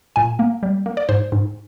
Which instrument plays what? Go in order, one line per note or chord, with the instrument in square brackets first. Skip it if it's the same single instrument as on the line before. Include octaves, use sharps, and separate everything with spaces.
[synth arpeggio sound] A#2 G#5
A#3
G3
A#3
D5
G#2 C5
G#2